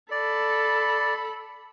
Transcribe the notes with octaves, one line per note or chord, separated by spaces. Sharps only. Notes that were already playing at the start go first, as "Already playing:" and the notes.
A4 D5 B5